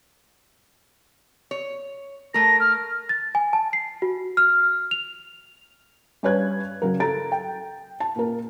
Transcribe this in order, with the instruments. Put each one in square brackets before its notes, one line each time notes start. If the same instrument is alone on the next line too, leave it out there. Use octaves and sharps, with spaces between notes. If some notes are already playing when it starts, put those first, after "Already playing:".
[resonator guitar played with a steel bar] C#5
[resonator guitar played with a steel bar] A3 A#4 [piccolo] A#6
[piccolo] F6
[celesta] A6
G#5
A5
C7
F#4
F6
F7
[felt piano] G2 C#4 B4 C#5 F#6 G#6
C#3 F#3 A#4
A4 A#5 A6 D7
G5
A5
A#2 A#4